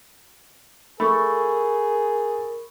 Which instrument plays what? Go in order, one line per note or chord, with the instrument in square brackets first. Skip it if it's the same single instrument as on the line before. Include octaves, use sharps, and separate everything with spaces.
[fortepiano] A3 [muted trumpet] G#4 [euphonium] A#4 [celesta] B5 C#6